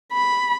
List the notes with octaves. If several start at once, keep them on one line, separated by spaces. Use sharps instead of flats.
B5